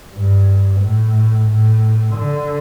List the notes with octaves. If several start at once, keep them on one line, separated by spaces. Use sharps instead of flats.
G2
A2
A2
D3